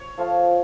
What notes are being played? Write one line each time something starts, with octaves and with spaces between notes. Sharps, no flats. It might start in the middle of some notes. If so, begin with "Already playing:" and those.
Already playing: C#5
F3 A3 F4